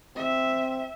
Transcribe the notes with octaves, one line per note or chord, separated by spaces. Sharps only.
C4 E5